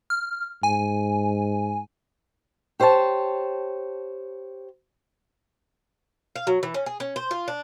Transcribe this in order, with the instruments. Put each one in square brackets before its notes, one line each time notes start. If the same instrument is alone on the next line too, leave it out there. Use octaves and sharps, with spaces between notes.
[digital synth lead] F6
[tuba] G#2 [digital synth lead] G#5
[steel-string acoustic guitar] G4 C5 C#5 F5 A5
[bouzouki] F5
F#3
E3
C#4
G#4
C#4
C5
F4
D4